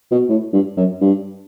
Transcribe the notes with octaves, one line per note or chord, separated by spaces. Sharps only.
B2
A2
G2
F#2
G2